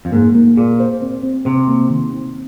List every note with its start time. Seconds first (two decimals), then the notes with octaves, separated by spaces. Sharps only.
0.05 F2
0.12 G#2 A#3
0.35 A#3
0.57 A#2 G#4
0.80 C5
1.02 C4
1.23 C4
1.45 C3 C5
1.68 A#3
1.90 D#3
2.12 C4